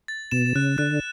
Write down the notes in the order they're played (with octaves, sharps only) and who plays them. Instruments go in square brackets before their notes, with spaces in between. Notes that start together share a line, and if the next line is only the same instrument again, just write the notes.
[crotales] A6
[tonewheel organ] B2 [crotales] E7
[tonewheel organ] C#3 [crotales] F#6
[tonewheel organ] D3 [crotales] F#6